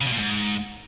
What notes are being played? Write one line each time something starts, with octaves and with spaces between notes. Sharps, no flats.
C#3
B2
A#2
G#2